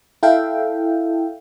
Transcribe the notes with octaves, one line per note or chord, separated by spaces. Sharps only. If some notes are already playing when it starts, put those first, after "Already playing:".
E4 A4 E5 F5 G5